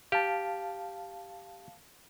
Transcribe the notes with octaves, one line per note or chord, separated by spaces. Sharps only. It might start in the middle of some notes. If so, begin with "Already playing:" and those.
G4 F5 A5